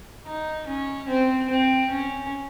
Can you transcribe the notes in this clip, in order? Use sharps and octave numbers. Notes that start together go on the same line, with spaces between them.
D#4
C#4
C4
C4
C#4